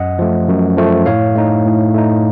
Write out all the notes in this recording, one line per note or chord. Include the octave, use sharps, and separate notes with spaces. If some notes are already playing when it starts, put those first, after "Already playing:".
Already playing: F#2 D#5 F#5
F3 A3
F#2
F3 A3
A2 C#5 F5
A3 D#4
A2
A3 D#4